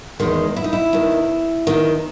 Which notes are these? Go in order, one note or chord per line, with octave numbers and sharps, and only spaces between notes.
E2 D#3 G#3
E4
D#4
E4
E2 D#3
E2 D#3